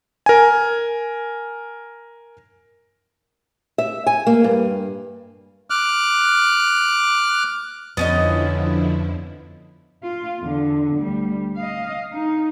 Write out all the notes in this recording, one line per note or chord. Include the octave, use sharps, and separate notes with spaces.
A#4 G#5
E5
G#5
A#3
G2
D6 F6 F#6
F2 D3 F3 B3 C#4 E4 D#5
F4
E2 D3
D2 G3
D#5 F5
D#4